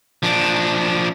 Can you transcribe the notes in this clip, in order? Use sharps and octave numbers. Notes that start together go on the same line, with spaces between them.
F3 D4